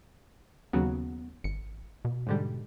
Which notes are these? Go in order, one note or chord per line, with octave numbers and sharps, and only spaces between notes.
D#2 C#3 F#3 B3
G#1 C#7
B2
G#2 D3 G3